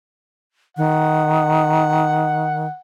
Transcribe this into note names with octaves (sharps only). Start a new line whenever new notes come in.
D#3 F#5